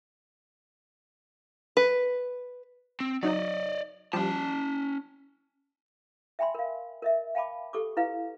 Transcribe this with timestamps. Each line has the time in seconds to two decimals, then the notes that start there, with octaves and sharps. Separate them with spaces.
1.77 B4
3.00 C4
3.23 F#3 D#4 D5 D#5
4.13 F3 G3 C#4 A5
6.39 E5 G5 G#5 B5 C6
6.55 A#4 F5
7.02 A#4 D#5 E5
7.35 F5 G5 A5 B5 D6
7.73 G4 A4 C#6 D6
7.97 E4 B4 F5